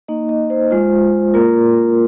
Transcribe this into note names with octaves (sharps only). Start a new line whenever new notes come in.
A#3 D#4 D#5
D#5
C5
G#3 F4
A#3 F4 A#4